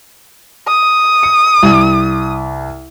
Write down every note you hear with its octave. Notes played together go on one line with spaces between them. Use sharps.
D#6
C#7
C2